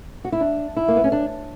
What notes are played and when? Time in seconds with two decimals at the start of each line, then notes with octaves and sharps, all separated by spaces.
0.25 F#4
0.32 E4
0.41 D4
0.77 E4
0.88 A#3
0.96 B3
1.04 C#4
1.12 D4